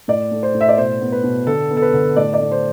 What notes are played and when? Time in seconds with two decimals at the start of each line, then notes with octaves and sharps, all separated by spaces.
0.08 A2 D5
0.31 A3
0.43 C5
0.54 A2
0.61 E5
0.69 D5
0.78 B2 C5
1.01 B3
1.12 B4
1.24 B2
1.47 D3 A4
1.71 B3
1.77 A4
1.82 B4
1.93 D3
2.16 A2 D5
2.34 D5
2.40 A3
2.52 C5